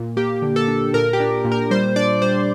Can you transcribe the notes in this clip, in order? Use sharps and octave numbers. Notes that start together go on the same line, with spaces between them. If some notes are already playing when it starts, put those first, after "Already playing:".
Already playing: A#2
A#3 G4
D3
A4
D4
A#2 A#4
G4
D4
A#2
A#4
G3 C5
D4 D5
G3 C5